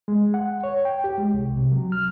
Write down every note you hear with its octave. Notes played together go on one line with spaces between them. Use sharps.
G#3
F#5
C#5
G5
G4
G#3
C2
C3
F#3
F6